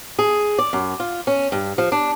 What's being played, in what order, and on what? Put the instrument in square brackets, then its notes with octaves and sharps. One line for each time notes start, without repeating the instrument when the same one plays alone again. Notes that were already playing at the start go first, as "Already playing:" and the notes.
[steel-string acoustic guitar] G#4
D5
F#2
F4
C#4
G2
F3
D4